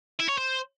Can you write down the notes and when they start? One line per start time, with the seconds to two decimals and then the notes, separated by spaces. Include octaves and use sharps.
0.19 E4
0.29 C#5
0.38 C5